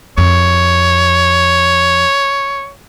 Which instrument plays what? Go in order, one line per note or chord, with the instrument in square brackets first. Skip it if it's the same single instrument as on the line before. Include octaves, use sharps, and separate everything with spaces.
[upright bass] F2 [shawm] C#5